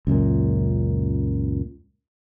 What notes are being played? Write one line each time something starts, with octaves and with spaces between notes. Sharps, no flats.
C#2 F#2 A#2